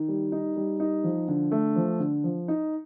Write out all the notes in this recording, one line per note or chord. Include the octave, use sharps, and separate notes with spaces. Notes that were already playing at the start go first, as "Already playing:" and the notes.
Already playing: D#3
G3
D#4
G3
D#4
F3
D3
A3
F3
D3
F3
D#4